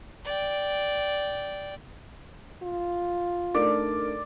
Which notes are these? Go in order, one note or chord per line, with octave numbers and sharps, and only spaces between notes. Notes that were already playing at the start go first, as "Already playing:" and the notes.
D5 G5
F4
A3 D4 D#4 A#4 D5